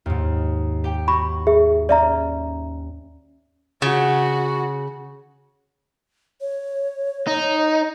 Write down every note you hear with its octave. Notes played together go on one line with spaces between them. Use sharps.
D#2 G#2
G4 G5
F#4 B5 C#6
G#4 E5
C#4 D5 E5 A#5
C#3 F#4 F#5
C#5
D#4